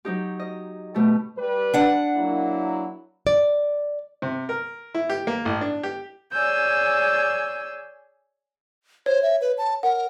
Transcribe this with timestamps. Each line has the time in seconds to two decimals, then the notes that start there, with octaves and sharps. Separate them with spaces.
0.05 F#3 D#4 G4
0.39 D#5
0.94 B2 A3 G4 A4
1.38 G3 B4
1.74 D4 F#5
2.16 F#3 A#3 E4
3.27 D5
4.22 C3
4.49 A#4
4.94 E4
5.10 G4
5.27 A#3
5.45 A1
5.61 D4
5.83 G4
6.33 G#4 C#5 D5 G#5 E6 G6
9.06 C5 C#5
9.23 E5
9.41 B4
9.58 A5
9.83 A#4 F#5